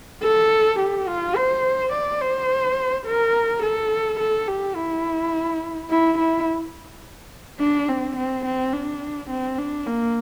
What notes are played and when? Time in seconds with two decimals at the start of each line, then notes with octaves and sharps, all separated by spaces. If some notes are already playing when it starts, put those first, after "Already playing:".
0.23 A4
0.79 G4
1.08 F4
1.36 C5
1.93 D5
2.21 C5
3.06 A#4
3.63 A4
4.19 A4
4.48 G4
4.76 E4
5.90 E4
6.18 E4
7.60 D4
7.88 C4
8.16 C4
8.45 C4
8.73 D4
9.30 C4
9.58 D4
9.86 A#3